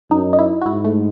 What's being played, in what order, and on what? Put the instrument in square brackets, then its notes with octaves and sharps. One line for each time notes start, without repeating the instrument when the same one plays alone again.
[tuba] F#2 [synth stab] D#4
[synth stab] D#4
E4
F#4
[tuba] G#2 [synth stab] E4
[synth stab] A3